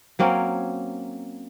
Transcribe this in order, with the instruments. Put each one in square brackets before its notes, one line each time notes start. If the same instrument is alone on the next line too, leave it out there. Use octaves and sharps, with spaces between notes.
[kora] F#3 A#3 C4 C#4